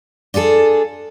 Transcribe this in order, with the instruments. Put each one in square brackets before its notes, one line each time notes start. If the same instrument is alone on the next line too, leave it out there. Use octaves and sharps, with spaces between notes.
[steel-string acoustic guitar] D4 F4 G#4 A4